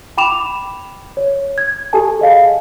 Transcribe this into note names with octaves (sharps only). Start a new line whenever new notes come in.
G5 B5 D6 E7 F7
C#5
G#6
G4 A4 G#5 A5
G#4 D#5 F5